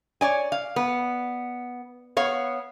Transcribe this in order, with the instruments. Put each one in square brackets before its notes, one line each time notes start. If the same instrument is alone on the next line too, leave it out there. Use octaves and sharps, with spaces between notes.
[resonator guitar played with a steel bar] C#5 D5 G#5
F5
B3
B3 C#5 F5